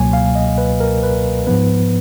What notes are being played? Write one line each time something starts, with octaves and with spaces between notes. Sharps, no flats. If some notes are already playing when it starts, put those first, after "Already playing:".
Already playing: C#2 B2 F#3 A#3 G#5
F5
D#5
B4
A#4
B4
G#2 F3 B3 B4